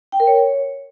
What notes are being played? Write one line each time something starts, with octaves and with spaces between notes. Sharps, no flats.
G5
A#4
C#5